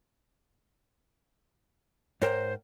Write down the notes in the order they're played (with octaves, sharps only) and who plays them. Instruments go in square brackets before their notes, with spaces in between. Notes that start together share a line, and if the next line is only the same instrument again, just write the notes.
[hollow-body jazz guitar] G#2 A#4 G5 [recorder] C5 [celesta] C#5